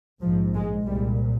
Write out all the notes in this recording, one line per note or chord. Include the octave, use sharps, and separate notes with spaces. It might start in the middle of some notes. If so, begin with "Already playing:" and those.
A#1 G#2 F3
G#3
C2 A#2 G3